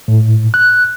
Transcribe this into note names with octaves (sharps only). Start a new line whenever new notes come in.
A2
F#6